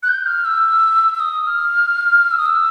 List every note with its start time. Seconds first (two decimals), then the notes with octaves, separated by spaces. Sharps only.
0.03 F#6
0.09 G6
0.26 F6
0.45 E6
1.14 E6
1.20 D#6
1.47 F6
2.31 E6
2.38 D#6
2.46 E6